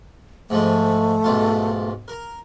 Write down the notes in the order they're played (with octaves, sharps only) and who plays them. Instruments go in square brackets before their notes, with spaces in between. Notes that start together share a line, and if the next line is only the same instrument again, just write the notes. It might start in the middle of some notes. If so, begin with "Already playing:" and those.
[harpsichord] G#2 F3 G#3 [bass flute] A3
[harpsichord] B1 G#2 F4
A#4 A#5